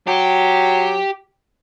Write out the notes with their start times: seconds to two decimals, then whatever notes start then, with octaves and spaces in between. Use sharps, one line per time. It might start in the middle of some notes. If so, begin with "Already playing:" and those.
0.08 F#3 G4